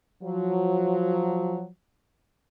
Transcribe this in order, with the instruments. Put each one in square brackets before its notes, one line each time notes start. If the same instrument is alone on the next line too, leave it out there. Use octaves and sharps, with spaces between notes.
[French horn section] F3 F#3